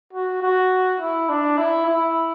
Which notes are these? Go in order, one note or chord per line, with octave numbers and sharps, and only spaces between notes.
F#4
F#4
E4
D4
E4
E4